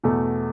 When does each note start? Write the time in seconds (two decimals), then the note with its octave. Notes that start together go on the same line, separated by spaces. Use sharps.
0.04 E2 B2 A3